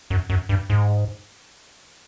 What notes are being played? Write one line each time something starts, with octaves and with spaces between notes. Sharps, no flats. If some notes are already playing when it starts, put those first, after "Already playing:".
F#2
F#2
G2
G#2